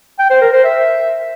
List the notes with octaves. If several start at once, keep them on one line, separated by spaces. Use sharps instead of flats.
G5
C5
A#4
C5
E5